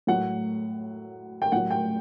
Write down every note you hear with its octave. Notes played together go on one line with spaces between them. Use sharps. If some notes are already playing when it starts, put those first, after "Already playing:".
A2 F#3 F#5
G5
A2 F#3 F#5
G5